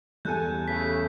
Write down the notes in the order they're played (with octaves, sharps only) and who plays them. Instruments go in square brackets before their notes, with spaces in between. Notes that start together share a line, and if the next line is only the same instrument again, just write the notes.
[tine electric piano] E2 [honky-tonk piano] G2 A4 G#5 [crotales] F#6 G6
[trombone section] C#3 E3 A3 [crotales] B6